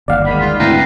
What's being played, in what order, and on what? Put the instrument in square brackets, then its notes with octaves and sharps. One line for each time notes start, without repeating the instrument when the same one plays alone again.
[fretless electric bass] G1 D#2 [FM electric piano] D5 F5 F#5
[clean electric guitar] D#3 G#3 [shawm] B5
[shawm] F4
[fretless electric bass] D2 G#2 C4 [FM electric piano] E4 G5 [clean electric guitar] B4 F5 [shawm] A#5